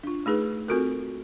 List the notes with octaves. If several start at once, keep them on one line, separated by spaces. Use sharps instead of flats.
D4 F4
A3 D#4 G#4 B4
C4 F4 F#4 A4 A#4